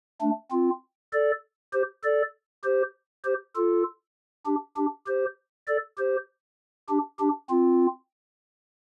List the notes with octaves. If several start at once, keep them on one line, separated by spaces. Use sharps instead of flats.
A3 D4
C4 F4
A4 D5
G4 C5
A4 D5
G4 C5
G4 C5
F4 A4
D4 G4
D4 G4
G4 C5
A4 D5
G4 C5
D4 G4
D4 G4
C4 F4